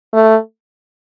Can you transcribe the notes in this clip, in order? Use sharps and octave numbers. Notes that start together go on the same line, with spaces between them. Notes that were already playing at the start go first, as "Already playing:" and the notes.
A3